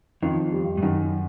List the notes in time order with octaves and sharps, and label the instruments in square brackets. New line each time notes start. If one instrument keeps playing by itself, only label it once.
[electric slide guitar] F2 [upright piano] D#3
[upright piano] G3
[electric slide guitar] G2
[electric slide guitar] F#2 [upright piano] D#3